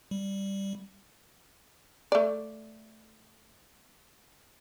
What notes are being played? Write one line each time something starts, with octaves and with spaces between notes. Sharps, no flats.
G3
A3 D5